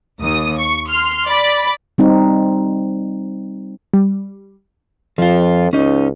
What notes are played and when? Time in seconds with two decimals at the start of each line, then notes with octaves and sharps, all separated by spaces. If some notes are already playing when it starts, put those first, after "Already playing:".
0.21 D#2 D#6
0.58 C#6
0.90 C6 F6
1.28 D5 B5
1.98 G3 C4 D#4
3.94 G3
5.18 F2 F3 F4
5.73 C#2 C#4 D#4